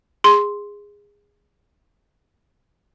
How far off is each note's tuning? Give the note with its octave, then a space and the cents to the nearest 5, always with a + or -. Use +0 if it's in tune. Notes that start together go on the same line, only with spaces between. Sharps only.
G#4 -20 C6 +0